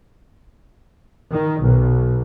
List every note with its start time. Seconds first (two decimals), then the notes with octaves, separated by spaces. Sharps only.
1.30 D#3
1.62 B1